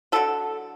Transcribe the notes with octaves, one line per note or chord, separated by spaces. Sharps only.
D3 F#3 A3 A4